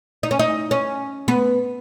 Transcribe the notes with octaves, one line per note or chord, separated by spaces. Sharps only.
D#4
C#4
D#4
C#4
B3